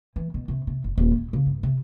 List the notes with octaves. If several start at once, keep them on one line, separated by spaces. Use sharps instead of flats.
E3
B2
C3
C3
F1
D#1
E4
C#3
G2
C3